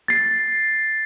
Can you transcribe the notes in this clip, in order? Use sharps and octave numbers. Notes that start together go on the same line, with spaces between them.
A6 C7